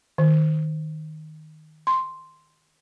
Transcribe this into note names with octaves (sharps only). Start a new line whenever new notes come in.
D#3
C6